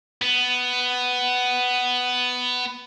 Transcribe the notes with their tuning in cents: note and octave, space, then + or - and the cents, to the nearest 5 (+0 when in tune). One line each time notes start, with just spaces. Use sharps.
B3 +10